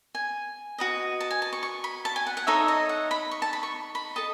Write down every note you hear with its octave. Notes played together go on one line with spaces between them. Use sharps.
G#5
F#4 B4 D#5
A5
G#5
A5
C#6
C#6
B5
A5
G#5
F#5
F#5
D#4 A4 C#5 E5
D#5
F#5
B5
C#6
A5
B5
C#6
B5
A4 D#5 A5